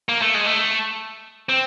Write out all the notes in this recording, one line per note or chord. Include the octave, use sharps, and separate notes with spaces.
A#3
A3
G#3
A3
C4